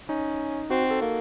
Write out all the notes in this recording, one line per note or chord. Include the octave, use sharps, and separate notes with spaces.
C#4 D#4
C4 F#4
F#4
A4
A#3